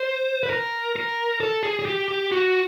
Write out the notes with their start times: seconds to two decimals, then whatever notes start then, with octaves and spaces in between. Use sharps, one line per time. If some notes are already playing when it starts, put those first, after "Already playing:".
Already playing: C5
0.43 B4
0.50 A#4
0.96 A#4
1.40 A4
1.63 G#4
1.79 G#4
1.85 G4
2.08 G4
2.32 F#4